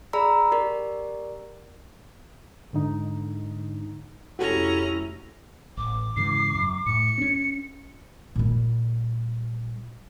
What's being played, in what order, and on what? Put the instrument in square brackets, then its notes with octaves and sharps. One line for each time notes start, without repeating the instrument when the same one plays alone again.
[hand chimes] G#4 D5 A#5 B5 E6
G4 A#4 D5
[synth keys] G#2 D3 D#4
[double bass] F1 E4 [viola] C#4 A#5 [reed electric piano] F#4 G4 A4
[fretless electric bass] A1 [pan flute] D6
[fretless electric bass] G#2 C#3 E3 [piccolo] C7
[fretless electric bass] F#2
[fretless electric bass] A2 [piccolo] C#7
[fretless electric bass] C4 C#4
[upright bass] A#2 G3